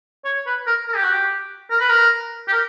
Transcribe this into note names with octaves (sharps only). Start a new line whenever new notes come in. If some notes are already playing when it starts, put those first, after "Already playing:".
C#5
B4
A#4
A#4
G4
F#4
G4
A#4
B4
A#4
G4
A#4